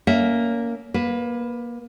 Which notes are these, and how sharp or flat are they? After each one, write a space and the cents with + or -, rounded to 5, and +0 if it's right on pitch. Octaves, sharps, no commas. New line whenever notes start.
A#3 +0 C#4 +30 E5 +0
A#3 +25 B4 +0